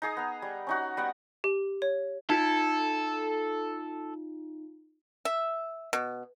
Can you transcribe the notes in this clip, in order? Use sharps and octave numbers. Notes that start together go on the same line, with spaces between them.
D#4 G#4 D#6
B3 A#5
G3
C#4 D#4 F#4
G3 B3 F#5
G4
C#5
D#4 F4 A4
E5
B2